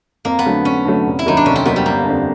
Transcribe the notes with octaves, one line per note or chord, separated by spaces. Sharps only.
F2 A#3
B3
D3 F#3 A3
F2 C#4
D3 F#3 A3
F1
E4
D#2 D#3 F#3 D#4
D4
F1 C#4
C4
D#2 D#3 F#3 B3
G3
G1 A#3
F2 D3